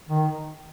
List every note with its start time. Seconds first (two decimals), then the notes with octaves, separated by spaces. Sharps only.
0.09 D#3